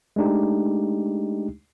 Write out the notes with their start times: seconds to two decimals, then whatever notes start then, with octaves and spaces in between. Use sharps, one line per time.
0.16 G#3 A3 D4 D#4 G4